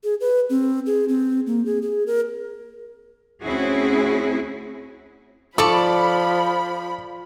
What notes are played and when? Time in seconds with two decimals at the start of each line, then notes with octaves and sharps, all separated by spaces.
0.04 G#4
0.21 B4
0.50 C4
0.86 G#4
1.09 C4
1.47 A#3
1.66 G#4
1.82 G#4
2.07 A#4
3.42 D2 C4 C#4 E4 F#4 G#4
5.58 F3 A4 D5 B5 C#6 D6